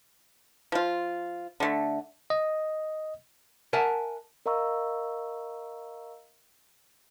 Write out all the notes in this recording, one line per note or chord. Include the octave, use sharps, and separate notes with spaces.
F3 F4
D3 A3
D#5
A#4 E5 F#5 G#5 A5
A#4 D#5 F5 A#5 C#6 E6